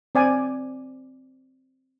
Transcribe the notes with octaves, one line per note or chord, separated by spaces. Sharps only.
C4 D5 G#5